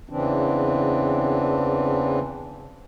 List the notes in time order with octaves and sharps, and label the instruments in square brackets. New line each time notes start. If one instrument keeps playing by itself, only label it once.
[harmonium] E2 C#3 E3 C4 D4